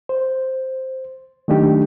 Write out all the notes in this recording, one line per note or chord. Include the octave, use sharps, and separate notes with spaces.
C5
D#3 F#3 A3 D4 D#4 G4